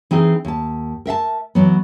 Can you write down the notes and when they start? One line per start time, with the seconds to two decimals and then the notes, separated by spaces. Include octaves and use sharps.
0.11 E3 C4 D#4 G#4
0.45 D#2 A5
1.05 A#4 E5 F5 A5
1.55 E3 F#3 B3